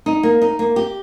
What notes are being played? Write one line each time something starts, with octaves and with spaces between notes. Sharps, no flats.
D#4
A#3
D#4
A#3
G4